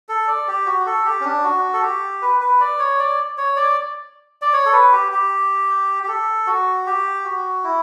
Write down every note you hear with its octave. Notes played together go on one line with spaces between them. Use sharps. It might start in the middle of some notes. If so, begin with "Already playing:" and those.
A4
D5
G4
F#4
A4
G4
C#4
D4
F#4
A4
G4
B4
B4
D5
C#5
D5
C#5
D5
D5
C#5
A4
B4
G4
G4
G4
A4
F#4
G4
F#4
E4